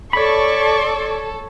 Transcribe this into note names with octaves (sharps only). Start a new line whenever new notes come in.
A4 C#5 D5 B5 C#6